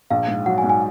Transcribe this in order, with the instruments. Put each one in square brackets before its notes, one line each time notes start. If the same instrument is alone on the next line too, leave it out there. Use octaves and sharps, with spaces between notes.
[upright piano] A#1 [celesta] F5
[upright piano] G#2
[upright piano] F#3 [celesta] F#5
[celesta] G#5
[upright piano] G#2
[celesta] G#5